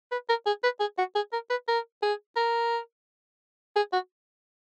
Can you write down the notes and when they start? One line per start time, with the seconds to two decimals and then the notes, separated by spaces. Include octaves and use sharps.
0.12 B4
0.29 A#4
0.46 G#4
0.64 B4
0.80 G#4
0.98 F#4
1.15 G#4
1.33 A#4
1.50 B4
1.68 A#4
2.03 G#4
2.36 A#4
3.76 G#4
3.93 F#4